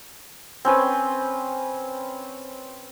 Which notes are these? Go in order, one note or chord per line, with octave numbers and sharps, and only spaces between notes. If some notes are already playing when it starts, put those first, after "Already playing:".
C4 C#4 B4